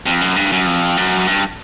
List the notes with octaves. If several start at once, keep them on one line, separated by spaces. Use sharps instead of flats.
F2
F#2
G2
F#2
F2
F#2
G2